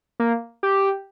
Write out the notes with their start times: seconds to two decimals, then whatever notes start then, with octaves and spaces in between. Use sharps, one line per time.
0.20 A#3
0.63 G4